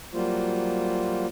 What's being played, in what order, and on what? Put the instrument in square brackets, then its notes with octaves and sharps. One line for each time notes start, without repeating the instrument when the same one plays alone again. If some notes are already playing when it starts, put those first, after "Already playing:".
[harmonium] F#3 G3 A#3 F4 C5